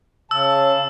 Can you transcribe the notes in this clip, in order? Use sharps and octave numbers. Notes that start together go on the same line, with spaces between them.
C#3 A5 E6